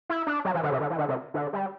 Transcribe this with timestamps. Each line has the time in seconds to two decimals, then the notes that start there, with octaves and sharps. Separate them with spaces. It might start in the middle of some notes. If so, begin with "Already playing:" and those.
0.09 E4
0.27 D4
0.45 F#3
0.54 E3
0.63 D3
0.72 C3
0.81 D3
0.90 E3
0.98 D3
1.08 C3
1.34 D3
1.53 G3